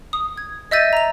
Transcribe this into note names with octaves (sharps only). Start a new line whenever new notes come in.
D#6
G#6
D#5 E5 E6 G6 A6 D#7
A#5 F7